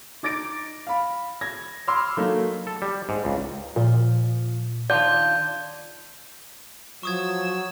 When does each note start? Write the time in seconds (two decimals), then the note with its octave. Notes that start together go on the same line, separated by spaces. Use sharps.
0.23 D#4 D6 A6 A#6 D7
0.87 F5 B5
1.41 G#6 A#6
1.88 B5 C6 D6 E6 F6
2.17 F#3 A3 A#3 D#4
2.67 A4
2.82 G3
3.09 G#2
3.25 C#2
3.76 A#2 F3
4.90 D#3 D4 F4 D5 G6
7.03 F3 F#3 C#6 D#6 E6 G#6